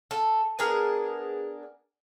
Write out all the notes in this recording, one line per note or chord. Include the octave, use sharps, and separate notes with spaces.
A4
B3 D4 G#4 A#4